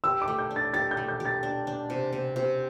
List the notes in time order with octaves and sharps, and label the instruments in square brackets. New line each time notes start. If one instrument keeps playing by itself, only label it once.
[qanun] G4 [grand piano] E6
[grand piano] D6
[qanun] A3
[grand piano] G6
[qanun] D4
[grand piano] A6
[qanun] G4 [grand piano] A6
[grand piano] G6
[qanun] A3
[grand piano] G6
[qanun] G4
[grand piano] A6
[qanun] D4
D4
C3
C3
C3